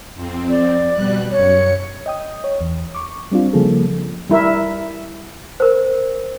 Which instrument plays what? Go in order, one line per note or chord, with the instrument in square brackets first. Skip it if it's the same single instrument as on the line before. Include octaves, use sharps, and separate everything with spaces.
[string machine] F2 C4
[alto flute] D5
[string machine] B2 G3 F#6
[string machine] F#2 C#7 [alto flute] C#5
[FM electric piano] D#5 G5 D#6
C#5
E2
C#6 D6
G3 C4 D4 F4
C#3 F3 G3 A#3 G#4 A4
[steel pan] G3 E4 A#4 E5
[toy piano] A#4 C5